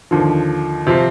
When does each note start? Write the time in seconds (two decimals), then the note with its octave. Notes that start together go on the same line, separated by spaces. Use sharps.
0.11 D#2 D3 F3
0.87 C3 F3 C4